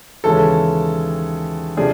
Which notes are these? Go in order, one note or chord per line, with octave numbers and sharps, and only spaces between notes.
D#2 C#3 E3 G#3 C#4 A4
C3 F3 A3 D4 G#4